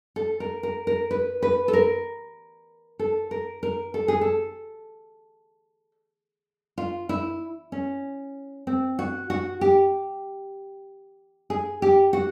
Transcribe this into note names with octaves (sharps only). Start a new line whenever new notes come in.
A4
A#4
A#4
A#4
B4
B4
A4
A#4
A4
A#4
A#4
A4
G#4
A4
F4
E4
C#4
C4
F#4
F#4
G4
G#4
G4
F#4